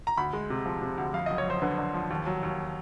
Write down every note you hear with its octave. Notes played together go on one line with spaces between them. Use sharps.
A#5
D2 B5
G#3
C3
F3
C3
D2
F2 F5
F#1 D#5
C#5
F2 C5
D3 B4
D3
F3
D#2
F#3
D#2